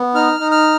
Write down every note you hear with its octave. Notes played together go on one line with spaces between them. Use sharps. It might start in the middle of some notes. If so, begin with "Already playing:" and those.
Already playing: B3
D#4 F6
D#4
F6